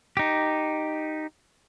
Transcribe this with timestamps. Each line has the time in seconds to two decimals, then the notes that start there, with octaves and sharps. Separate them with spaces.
0.17 D#4 G4